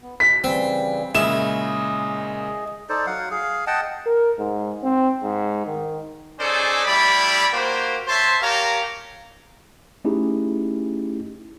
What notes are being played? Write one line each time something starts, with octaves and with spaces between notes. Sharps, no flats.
B3
B2 B6
C#3 E3 G3 C4
A#2 C#3 G#3 E4 G#4 D#5 E7
D#4 A4 C5 D5
F#3 F5 F#5
G#4 F5
D#5 F#5 G5 A5
A#4
G#2
C4
G#2
D#3
C#4 D#4 G#4 A4 C5 D5
G3 A3 E4 D5 B5
A#3 F#4 G4 C5
C5 C#5 E5 A5 C6
G4 A#4 C#5 F5 A5 A#5
A3 C#4 D#4 E4 G4 G#4